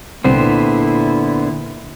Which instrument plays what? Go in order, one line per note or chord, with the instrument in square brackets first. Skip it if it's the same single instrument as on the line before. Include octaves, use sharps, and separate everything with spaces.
[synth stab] C2 C4 [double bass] A#2 E4 [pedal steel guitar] D3 B3 C5